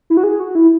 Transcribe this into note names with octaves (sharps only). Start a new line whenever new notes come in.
E4
F#4
G#4
F#4
E4